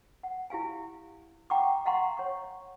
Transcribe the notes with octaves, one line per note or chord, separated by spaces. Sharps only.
F#5
E4 G4 F5 G#5
F#5 G5 A#5 B5 C#6 D6
D#5 F5 F#5 A#5 C6 C#6
C#5 F#5 C#6